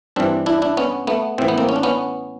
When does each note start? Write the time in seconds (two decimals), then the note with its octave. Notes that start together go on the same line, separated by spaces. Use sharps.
0.16 G2 E3 C4 D4
0.46 D4 E4
0.62 D4 E4
0.77 B3 C#4
1.07 A3 B3
1.38 A2 E3 C4
1.48 B3
1.58 A#3 C4
1.69 C#4
1.76 D4
1.83 B3 C#4